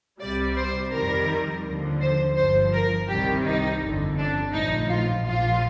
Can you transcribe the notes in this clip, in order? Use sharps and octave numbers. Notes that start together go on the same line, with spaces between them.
C2 C3 G3 D5
C5
F2 D#3 G3 A#4
D#2 D3 F3
C5
G1 G2 F3 C5
A#4
C2 C3 D#3 G3 G4
D#4
G1 F2 D3
D4
A#1 A2 F3 D#4
F4
A#1 A#2 F3 F4